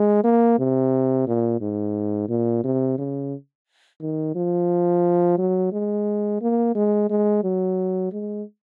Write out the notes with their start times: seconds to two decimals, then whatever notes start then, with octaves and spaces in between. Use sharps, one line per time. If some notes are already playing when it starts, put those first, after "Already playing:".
Already playing: G#3
0.24 A#3
0.59 C3
1.27 A#2
1.61 G#2
2.29 A#2
2.64 C3
2.98 C#3
4.01 D#3
4.35 F3
5.38 F#3
5.72 G#3
6.41 A#3
6.75 G#3
7.10 G#3
7.44 F#3
8.13 G#3